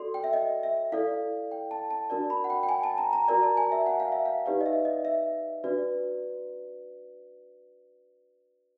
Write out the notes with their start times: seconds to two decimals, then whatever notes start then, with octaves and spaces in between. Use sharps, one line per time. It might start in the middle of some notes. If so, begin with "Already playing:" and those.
Already playing: F#4 A4 D5 C6
0.14 G5
0.24 E5
0.33 D#5
0.63 E5
0.92 E4 A4 D5 F5
1.51 G5
1.71 A5
1.91 A5
2.10 D4 F#4 A#4 D5 A5
2.30 B5
2.44 F#5
2.50 G5
2.63 G5
2.69 G#5
2.83 A5
2.98 A#5
3.13 A#5
3.28 F#4 A#4 D5 A#5
3.43 A5
3.57 G#5
3.72 E5
3.86 F#5
4.00 F5
4.12 E5
4.25 F5
4.46 D#4 G4 B4 D5 F5
4.61 D#5
4.66 E5
4.85 D#5
5.05 E5
5.64 D4 F#4 B4 D5